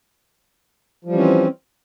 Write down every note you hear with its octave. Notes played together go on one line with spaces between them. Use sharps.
E3 F3 G3 C4 C#4